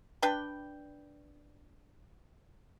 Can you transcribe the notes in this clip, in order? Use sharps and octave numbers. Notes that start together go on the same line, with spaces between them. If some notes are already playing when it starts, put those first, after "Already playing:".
D4 B4 G5